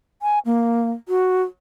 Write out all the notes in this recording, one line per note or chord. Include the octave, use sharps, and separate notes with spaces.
G#5
A#3
F#4